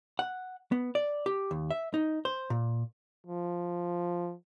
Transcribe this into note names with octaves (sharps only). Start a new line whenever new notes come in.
F#5
B3
D5
G4
D#2
E5
D#4
C5
A#2
F3